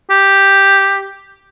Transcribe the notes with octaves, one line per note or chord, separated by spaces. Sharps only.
G4